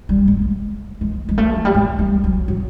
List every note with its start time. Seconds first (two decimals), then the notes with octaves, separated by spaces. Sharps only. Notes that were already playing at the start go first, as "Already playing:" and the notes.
0.09 G3
0.28 G#3
1.01 G#3
1.29 G#3
1.38 A3
1.56 F#3
1.65 G3
1.74 G#3
1.99 G3
2.24 F#3
2.48 F#3